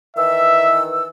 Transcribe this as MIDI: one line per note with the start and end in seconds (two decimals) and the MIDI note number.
0.16 1.06 51
0.16 1.06 52
0.16 0.81 76
0.16 1.06 88